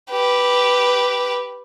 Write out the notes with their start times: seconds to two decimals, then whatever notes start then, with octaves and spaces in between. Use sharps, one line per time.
0.11 G4 B4